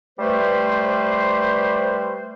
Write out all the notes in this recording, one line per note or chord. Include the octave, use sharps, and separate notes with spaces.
G3 A3 B4 C5